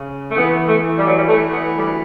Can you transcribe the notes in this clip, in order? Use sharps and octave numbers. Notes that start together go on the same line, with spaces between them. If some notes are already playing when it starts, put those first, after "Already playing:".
Already playing: C#3
A3
E3 B3
A3
E3
G3
F#3
G3
E3 A3
B3
D2 G3